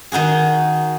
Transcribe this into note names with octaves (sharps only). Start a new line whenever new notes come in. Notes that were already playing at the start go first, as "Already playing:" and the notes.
D#3 D#4 F#4 G#4